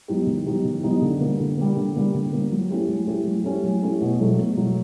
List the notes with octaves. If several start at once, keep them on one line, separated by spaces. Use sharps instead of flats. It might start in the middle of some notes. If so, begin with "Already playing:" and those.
F#3 B3 D#4 G4
D#3
F#3 B3 D#4 G4
D#3
F#3 B3 D#4 G4
D3
G3 A#3
D3
G3 A#3
D3
G3 A#3
D3
G3 A#3
F#3
A3 C#4 E4 G4
F#3
A3 C#4 E4 G4
F#3
A3 C#4 E4 G4
F#3
A3 C#4 E4 G4
B2
F#3 A3
B2
F#3 A3